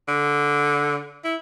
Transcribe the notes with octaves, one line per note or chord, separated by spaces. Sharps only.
D3
E4